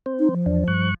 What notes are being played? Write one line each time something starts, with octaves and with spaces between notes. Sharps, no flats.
C4 C5
D#4
F3
E2 D4
G2 C#6 F#6